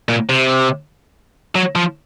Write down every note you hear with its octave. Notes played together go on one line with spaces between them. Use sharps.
A#2
C3
F#3
F3